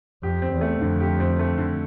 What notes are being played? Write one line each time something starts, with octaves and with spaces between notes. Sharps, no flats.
F2 G4
C4
E2
A3
F2 D3
G4
C4
A3
D3